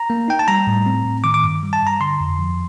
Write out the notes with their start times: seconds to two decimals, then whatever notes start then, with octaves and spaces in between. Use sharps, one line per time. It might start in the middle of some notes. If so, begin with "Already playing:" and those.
Already playing: A#5
0.10 A#3
0.28 D#4 G5
0.39 A5
0.48 G3 A#5
0.67 A2
0.86 C4
1.06 A2
1.24 D#3 D6
1.34 D6
1.43 G2
1.63 G3
1.73 A5
1.82 G2 A#5
2.01 D3 C6
2.20 F2
2.39 F3